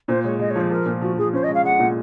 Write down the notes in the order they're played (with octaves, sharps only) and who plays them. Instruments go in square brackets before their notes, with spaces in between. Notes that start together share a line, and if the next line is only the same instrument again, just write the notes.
[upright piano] A#2 [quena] C5
[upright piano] G#3 [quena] C#5
[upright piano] G#3 [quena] D#5
[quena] C#5
[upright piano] F3 [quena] C5
[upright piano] F3 [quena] A#4
[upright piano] A#2
[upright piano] F3 [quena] F#4
[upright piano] F3 [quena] G#4
[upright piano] C#4 [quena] C5
[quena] D#5
[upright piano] G#3
[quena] F5
[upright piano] G#3 [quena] F#5
[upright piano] A#2